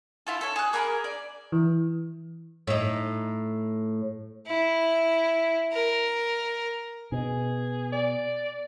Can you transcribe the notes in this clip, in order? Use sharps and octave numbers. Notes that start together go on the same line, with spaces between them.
E4 F4 A4
A4 C#5
G#4 F#6
A#3 G#4 A#4 B5
D5
E3
A2 D#4
E4
A#4
B2 G#4
D5